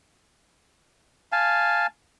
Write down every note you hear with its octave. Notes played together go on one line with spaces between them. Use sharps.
F5 G#5 A5